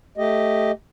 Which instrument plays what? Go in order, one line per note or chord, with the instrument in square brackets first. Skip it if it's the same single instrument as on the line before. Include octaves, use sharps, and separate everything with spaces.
[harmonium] A3 G4 D#5